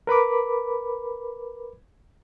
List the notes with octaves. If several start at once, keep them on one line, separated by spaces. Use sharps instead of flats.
A#4 B4 B5 D6